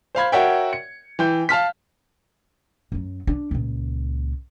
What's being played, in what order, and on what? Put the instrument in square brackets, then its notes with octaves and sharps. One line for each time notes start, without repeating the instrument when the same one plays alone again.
[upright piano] C5 F5 B5 G#6
F#4 A#4 C#5 E5 F#5 G5
C#7
E3 G5 G6
F5 A5 F6 B6
[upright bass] F#2 F#3
D4
C#2 A#2